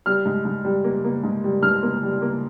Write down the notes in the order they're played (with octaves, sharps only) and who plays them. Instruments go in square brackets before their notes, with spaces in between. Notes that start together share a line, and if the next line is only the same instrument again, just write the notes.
[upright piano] G3 F6
G#2
G#2
G3
A#3
A#3
G#2
G3
G#2 F6
A#3
G3
A#3